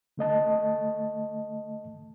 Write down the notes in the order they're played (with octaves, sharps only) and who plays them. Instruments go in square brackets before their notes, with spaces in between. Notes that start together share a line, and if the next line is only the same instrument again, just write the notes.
[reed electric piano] D3 A3 D#5 A5